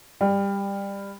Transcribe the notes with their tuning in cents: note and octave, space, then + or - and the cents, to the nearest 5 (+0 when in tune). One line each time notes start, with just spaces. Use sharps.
G3 +20